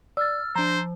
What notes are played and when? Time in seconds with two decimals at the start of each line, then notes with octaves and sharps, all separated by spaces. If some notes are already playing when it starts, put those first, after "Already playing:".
0.17 D5 E6 F6 A6
0.56 F3 D4 C5 A#5